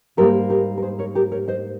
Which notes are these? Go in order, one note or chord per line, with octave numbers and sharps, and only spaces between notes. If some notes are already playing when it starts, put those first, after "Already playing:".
G#2 G3 A#3 G4 A#4
G4 A#4
A#4
G#4 C5
A#4 C#5
G4 A#4
A#4 C#5
C5 D#5